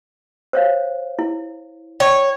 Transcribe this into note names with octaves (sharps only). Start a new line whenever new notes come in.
C5 C#5 F5
E4
C#5 G5